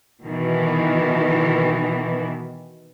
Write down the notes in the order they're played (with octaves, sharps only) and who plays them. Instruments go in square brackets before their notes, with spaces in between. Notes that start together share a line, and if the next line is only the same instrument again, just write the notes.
[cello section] B2 D#3 E3